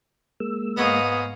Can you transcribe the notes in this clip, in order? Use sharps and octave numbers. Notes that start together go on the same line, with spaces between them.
G#3 A#3 E6
G#2 B3 C#5 D#5 F5 D#6